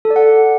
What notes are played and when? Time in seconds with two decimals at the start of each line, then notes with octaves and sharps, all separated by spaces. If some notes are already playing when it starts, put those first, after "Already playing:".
0.05 A4
0.10 D5
0.16 F#5